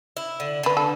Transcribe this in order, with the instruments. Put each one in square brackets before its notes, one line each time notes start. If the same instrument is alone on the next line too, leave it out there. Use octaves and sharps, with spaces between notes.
[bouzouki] E4
D3
[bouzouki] D3 [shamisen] B4
[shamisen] A4